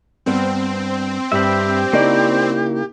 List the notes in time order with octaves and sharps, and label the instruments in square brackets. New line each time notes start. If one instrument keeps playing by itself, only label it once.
[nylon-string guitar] G2 G3 B3 [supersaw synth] C4
[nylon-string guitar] G2 [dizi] G4 [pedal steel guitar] E5 B5
[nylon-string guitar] C#3 D#4 D5 [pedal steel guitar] A#3 E4